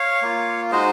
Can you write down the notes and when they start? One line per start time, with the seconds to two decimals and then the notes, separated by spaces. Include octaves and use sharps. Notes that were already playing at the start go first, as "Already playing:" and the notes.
Already playing: C#5 F5
0.22 A#3 F4
0.71 G#3 D#4 F#4 C5 D#5